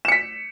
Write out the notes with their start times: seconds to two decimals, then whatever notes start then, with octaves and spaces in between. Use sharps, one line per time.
0.05 E7
0.08 C#7
0.12 B6